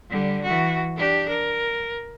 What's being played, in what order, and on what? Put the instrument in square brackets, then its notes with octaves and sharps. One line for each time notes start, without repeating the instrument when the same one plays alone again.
[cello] D3 G3
E3 F#4
D4 G4
A#4